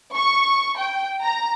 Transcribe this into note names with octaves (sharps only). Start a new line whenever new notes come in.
C#6
G5
A#5